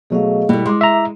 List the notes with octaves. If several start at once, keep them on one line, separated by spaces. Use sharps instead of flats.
B2 F#3 A3 G#4 D#5 F5
B2 G3 A3 E4
G#3 C6 D6
E5 A#5